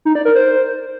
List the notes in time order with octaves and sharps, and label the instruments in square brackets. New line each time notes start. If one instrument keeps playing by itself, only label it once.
[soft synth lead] D#4
D5
A#4
C5